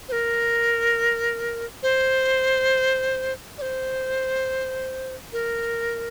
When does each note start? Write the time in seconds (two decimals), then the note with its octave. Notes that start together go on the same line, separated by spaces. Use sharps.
0.08 C5
0.12 A#4
1.83 C5
3.58 D5
3.62 C5
5.33 A#4